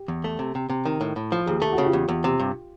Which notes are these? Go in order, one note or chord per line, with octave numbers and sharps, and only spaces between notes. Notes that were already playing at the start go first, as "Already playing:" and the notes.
Already playing: G4
E2
A3
C3
C3
C3
D#3
A2
A2
F3
D#2 G#4
A3 G4
F#4
C#3
F4 G4
E2
E2
C3
G2